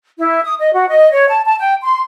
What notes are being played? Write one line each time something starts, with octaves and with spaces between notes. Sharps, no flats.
E4
D#6
D#5
F#4
D#5
C#5
A5
A5
G5
C6